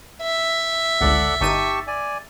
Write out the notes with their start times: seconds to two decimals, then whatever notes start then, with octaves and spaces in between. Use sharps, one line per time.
0.22 E5
1.01 G1 C#2 A4 D5 F#5
1.41 G1 D#4 G4 A5 C#6 D#7
1.87 D5 G#5